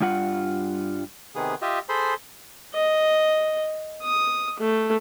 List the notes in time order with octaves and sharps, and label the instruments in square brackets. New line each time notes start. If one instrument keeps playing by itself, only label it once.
[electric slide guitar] G2 G3 F4 F#5
[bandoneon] C3 D#3 B3 G#4
F4 G4 D#5 E5
G#4 A4 C5 B5 C6
[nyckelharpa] D#5
D#6
A3